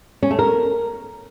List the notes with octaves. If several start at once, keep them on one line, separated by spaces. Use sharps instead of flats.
C#4
A3
A#4